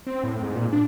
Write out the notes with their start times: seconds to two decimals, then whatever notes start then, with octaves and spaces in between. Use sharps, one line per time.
0.07 C4
0.24 A2
0.43 G#2
0.55 A#2
0.73 D4